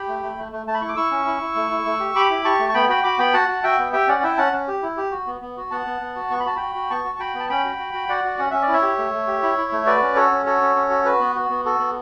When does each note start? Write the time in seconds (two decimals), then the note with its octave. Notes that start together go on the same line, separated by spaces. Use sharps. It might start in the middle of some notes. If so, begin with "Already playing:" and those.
Already playing: G4 G5 B5
0.08 A3
0.23 A3
0.38 A3
0.52 A3
0.66 A3 A5
0.74 B5
0.81 E4 C#6
0.89 D6
0.96 E4 C#6 E6
1.11 C#4
1.26 E4
1.41 E4
1.55 A3
1.71 E4
1.86 A3
2.00 G4
2.15 G4 B5 D6
2.30 E4
2.45 G4 A5 C#6
2.59 A3
2.69 C#6
2.74 B3 G5 B5
2.89 F#4 G5 B5
3.04 F#4 B5 D6
3.18 B3 G5 B5
3.34 F#4 F#5 A5
3.48 F#4
3.63 F#4 E5 G5
3.79 B3
3.93 G4 E5 G5
4.08 C#4 D5 F#5
4.23 E4 E5 G5
4.38 C#4 F#5 A5
4.52 C#4
4.68 G4
4.82 E4
4.97 G4
5.11 F#4
5.27 B3
5.41 B3
5.57 F#4
5.71 B3 F#5 A5
5.86 B3
6.01 B3
6.16 F#4
6.30 B3 C#6
6.40 B5
6.46 F#4 A5
6.56 F#4 G5 B5
6.75 F#4
6.90 B3 A5 C#6
7.04 F#4
7.19 F#4 G5 B5
7.35 B3 A5
7.49 C#4 G5 B5
7.64 F#4
7.78 F#4
7.94 F#4
8.09 F#4 D5 F#5
8.24 F#4
8.39 C#4 F#5
8.51 C#4 E5
8.62 D5
8.68 E4
8.74 C#5 E5
8.82 G4
8.98 A3
9.13 A3
9.27 G4
9.43 E4
9.57 E4
9.72 A3
9.86 F#4 B4 D5
10.02 C#4
10.16 F#4 A4 C#5
10.31 C#4
10.46 F#4 A4 C#5
10.61 C#4
10.76 C#4
10.90 F#4
11.05 F#4 B4
11.21 B3
11.36 F#4
11.50 B3
11.65 F#4 A4
11.79 B3